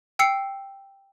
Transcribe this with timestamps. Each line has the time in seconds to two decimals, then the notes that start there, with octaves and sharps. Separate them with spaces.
0.19 G5 E6 C7 C#7